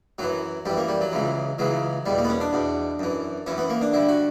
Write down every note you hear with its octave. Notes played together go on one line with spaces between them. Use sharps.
F#2 E3 F#3
F#2 E3 G3
A#3
G3
F#3
C#2 C#3 E3
C#2 C#3 E3 F#3
E2 B2 G3
A#3
B3
C#4
D4
E2 B2
F#2 E3
F#2 E3 C#4
B3
A#3
D4
G2 D3 E4
F#4